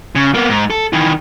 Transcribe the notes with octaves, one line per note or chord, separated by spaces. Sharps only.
C#3
A#3 B3
G#2
A4
D#3 E3